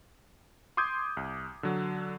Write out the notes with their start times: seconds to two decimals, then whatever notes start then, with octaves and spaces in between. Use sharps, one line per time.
0.77 C6 D6 D#6 G6 G#6
1.17 C2
1.63 D3 F#3